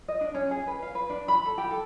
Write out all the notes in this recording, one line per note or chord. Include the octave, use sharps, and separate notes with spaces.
D#5
D4
C#4
G#4
B4
F5
B4
D4
B5
A4
G4
A4